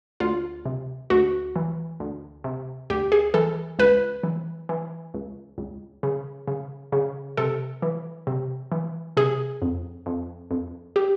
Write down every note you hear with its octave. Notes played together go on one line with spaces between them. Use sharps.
D2 F4
C3
D2 F#4
E3
D2
C3
D2 G4
G#4
E3 A4
C#2 B4
E3
E3
C#2
C#2
C#3
C#3
C#3
C3 A4
E3
C3
E3
C3 G#4
F2
F2
F2
G4